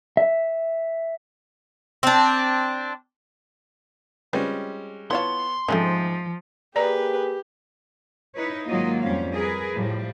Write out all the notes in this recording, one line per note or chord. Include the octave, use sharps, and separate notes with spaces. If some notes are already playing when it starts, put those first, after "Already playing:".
E5
C4 D4
G3 G#3 C4 C#4 F4 B4
B3 E4 F4 C#5 A5 C6
G#2 F3 A3 C4 C#4
A#3 G4 G#4 B4 D5 A#5
D#4 E4 B4 C#5
G#2 D#3 F#3 A#3 F4 D#5
F2 G3 C#4 F5
G#4 A#4 B4
A2 F3 G3